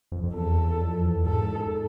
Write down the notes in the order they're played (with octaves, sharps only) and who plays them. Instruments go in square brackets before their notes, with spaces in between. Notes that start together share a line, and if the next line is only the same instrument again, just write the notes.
[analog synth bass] F2
F2
[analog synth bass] E2 [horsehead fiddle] A4
[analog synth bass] F2
E2
[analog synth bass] G#2 [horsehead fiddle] A4